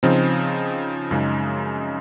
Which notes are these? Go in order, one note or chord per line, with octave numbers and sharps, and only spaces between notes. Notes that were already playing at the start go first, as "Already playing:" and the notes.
C#3 F3 C4 D#4
F#2 C#3 G#3 D#4